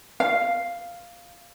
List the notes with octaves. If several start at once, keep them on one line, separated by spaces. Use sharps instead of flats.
F5